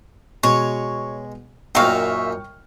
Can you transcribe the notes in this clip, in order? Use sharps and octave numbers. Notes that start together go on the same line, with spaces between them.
B2 G#3 C#5
F#2 A#2 D#4 E5 F5 G5 C#6 F6